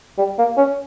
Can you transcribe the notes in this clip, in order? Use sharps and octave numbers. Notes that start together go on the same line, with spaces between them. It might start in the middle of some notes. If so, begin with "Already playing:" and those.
G3
A#3
C#4